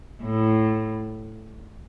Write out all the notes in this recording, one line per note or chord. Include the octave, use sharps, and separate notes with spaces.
A2